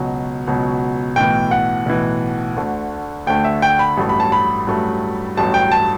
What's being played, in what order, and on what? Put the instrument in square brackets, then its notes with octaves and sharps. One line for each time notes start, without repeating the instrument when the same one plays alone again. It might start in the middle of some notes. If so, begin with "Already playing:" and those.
Already playing: [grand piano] C#2 B2 F#3
C#2 B2 F#3
B1 A2 E3 G5
F#5
B1 A2 E3
D2 D3 A3
D2 D3 A3 G5
E5
G5
B5
A1 G2 F#3 A3
B5
A5
B5
A1 G2 F#3 A3
A1 G2 F#3 A3 A5
G5
A5